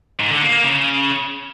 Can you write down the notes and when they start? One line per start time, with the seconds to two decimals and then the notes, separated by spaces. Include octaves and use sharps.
0.20 G#2
0.31 D3
0.42 A#3
0.53 A#3
0.64 C#3